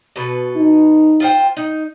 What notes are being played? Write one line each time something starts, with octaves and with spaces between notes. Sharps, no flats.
B2 A4 B4
D#4
F4 C5 G5
D#4